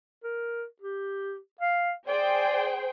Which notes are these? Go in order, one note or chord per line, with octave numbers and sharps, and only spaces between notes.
A#4
G4
F5
G#4 C5 D5 G5